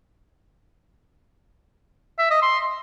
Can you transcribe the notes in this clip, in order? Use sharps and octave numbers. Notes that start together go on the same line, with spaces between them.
E5
D#5
C6